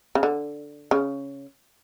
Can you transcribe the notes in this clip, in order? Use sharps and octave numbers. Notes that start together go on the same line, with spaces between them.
C#3
D3
C#3